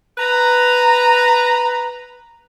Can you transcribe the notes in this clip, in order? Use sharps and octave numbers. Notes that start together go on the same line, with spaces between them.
B4 A#5